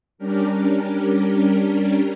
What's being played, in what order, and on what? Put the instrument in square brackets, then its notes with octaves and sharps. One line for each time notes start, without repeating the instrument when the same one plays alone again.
[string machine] G3 C#4 D4 G4 A#4